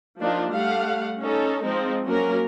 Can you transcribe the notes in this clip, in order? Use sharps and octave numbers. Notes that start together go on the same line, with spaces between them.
F3 A#3 D4 D#4 F4
G3 A3 F5 F#5
C#4 D#4 A4
F3 G#3 C4 D#4
F#3 A#3 C#4 A#4